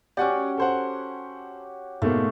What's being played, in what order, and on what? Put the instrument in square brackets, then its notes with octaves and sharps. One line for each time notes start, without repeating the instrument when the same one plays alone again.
[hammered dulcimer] C#4 F#4 G4 [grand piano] D5 F#5 G#5
[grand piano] A4 C5 F#5
[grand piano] G#2 B2 A#3 [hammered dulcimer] A3